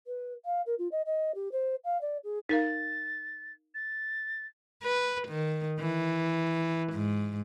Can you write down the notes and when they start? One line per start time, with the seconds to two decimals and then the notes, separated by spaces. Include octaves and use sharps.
0.07 B4
0.45 F5
0.66 A#4
0.78 F4
0.91 D#5
1.06 D#5
1.35 G4
1.52 C5
1.84 F5
2.01 D5
2.24 G#4
2.49 D#4 A#4 F5 A6
3.74 A6
4.83 B4
5.28 D#3
5.79 E3
6.93 G#2